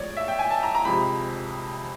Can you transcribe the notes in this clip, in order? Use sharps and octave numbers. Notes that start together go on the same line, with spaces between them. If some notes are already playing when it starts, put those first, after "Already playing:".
Already playing: A2 F3 G#3 C#5 D5
E5
G5
G#5
A5
A#5
A#5
F2 C3 F3 G#3 B5